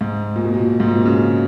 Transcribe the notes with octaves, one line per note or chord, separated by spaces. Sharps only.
G#2
A#2
B2
A#2
G#2
A#2
B2
C#3